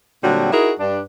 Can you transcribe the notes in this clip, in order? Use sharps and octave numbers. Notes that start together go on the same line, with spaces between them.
A#2 D3 F#3 G3 C4 F#4
D#4 E4 F#4 G#4 A#4
G2 D4